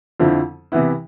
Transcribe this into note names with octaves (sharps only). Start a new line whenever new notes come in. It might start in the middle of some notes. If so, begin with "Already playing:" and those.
F2 D3 F3 C4 E4
C3 E3 B3 E4